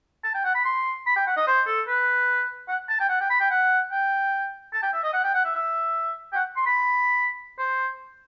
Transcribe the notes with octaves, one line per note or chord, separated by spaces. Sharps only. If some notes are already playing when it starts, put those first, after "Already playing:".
A5
G5
F#5
B5
C6
B5
G5
F#5
D#5
C5
A4
B4
F#5
A5
G5
F#5
G5
B5
G5
F#5
G5
A5
G5
E5
D#5
F#5
G5
F#5
E5
E5
G5
F#5
C6
B5
C5